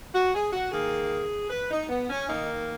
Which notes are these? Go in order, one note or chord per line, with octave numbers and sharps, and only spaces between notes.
F#4
G#4
F#4
D#3 A#3 G#4
B4
D#4
B3
C#4
D#3 A#3 D#4